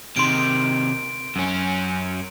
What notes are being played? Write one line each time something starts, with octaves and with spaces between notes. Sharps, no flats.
C3 D#3 C6 D7
F#2 C#4